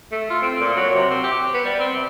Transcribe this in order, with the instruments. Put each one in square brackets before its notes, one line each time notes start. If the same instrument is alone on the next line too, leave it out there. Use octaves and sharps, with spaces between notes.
[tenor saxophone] A3
F4
C4
A#2
F#3
C3
C4
G4
B3
G3
C4
C3